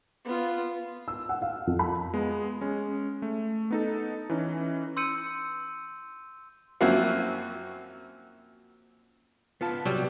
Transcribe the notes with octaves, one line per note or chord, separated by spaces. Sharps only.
B3 F4
E6
F#5
F5
F2
B5
G#3 B3
G#3 C#4
A3
B3 D#4 A4
E3 C#4 D#4
C6 E6 G6 C#7 D#7
F#2 F3 A#3 C4 E4 F#4
B3 F4 A5
C2 F#3 G3